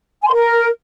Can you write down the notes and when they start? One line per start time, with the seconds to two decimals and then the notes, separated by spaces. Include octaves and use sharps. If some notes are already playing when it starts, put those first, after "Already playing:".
0.22 G#5
0.27 C6
0.33 A#4